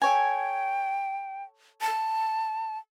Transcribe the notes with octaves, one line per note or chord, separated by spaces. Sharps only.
A4 C#5 G5 G#5
A5